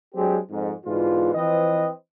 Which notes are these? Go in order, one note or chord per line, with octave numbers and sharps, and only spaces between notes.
F#3 G#3 C4 D4 G4 G#4
F2 G#2
G#2 B2 D3 E3 F4
E3 F3 C4 B4 D#5